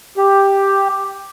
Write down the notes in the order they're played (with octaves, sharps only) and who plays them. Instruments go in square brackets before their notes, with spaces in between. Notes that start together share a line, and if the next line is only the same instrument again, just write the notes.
[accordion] G4